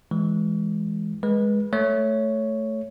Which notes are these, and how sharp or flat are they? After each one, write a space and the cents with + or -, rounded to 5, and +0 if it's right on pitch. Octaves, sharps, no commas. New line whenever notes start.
E3 +0 G#3 +0
G#3 +0 B4 -25
A3 +0 C#5 +5